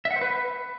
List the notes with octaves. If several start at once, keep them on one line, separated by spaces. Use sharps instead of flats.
E5
F#5
C5
B4